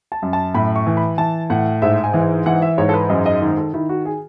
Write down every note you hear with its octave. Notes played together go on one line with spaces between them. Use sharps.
A5
F#2
A5
A2 B5
C#6
E3
B5
E3 A5
A2 F#5
G#2 E5
G#5
E3
E3 F#5
E5
G#2 C#5
A4
B4
F#2 D#5
D#5
D#3
A4
D#3 E4
F#4
G#4